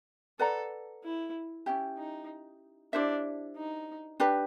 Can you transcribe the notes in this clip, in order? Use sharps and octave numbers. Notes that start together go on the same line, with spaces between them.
A4 B4 D5 F#5 A#5
E4
C#4 E4 G4
D#4
D4 E4 G4 C5 E5
D#4
D4 G4 B4